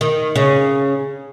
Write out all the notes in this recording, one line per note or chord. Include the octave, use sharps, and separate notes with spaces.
D#3
C#3